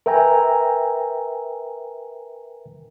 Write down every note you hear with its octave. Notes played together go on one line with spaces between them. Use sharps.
A#4 B4 E5 G5 G#5 A#5